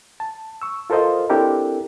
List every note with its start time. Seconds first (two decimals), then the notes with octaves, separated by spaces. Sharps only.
0.20 A5
0.62 C#6 E6
0.90 F4 A4 A#4 C5 D#5 F5
1.30 C4 D4 E4 G4 A4 A#4